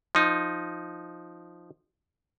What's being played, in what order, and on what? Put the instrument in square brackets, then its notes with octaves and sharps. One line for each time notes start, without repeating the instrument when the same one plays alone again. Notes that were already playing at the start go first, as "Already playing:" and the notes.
[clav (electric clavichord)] F3 D#4